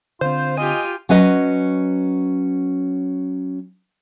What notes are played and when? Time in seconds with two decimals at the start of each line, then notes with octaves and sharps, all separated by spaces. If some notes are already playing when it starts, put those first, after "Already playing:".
0.21 D3 C4 F4 C5
0.57 F4 G4 D#5 G#5
1.09 F#3 C#4 B4 D#5